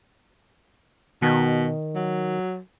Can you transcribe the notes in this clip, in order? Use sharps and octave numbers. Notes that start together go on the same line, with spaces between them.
B2 D#3
F#3